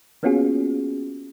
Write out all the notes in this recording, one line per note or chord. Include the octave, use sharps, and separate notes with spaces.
A#3 B3 C#4 F4 F#4 G#4